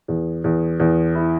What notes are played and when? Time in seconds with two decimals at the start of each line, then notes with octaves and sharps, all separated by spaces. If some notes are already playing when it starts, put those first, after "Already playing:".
0.08 E2
0.44 E2
0.80 E2
1.15 E4